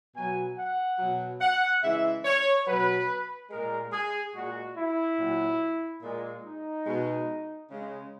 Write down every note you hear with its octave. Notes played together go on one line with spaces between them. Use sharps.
B2 F#3 G#5
F#5
B2 F#3
F#5
C#3 E3 G#3 E5
C#5
B2 F#3 B4
A#2 G#3 A#4
G#4
A#2 G#3 F#4
E4
A#2 F#3
A#2 G#3
D#4
B2 G#3
C#3 G#3